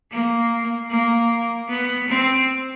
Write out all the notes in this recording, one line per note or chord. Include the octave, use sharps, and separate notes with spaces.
A#3
A#3
B3
C4